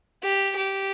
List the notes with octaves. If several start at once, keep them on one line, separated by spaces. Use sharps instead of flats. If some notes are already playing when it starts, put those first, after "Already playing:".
G4
G4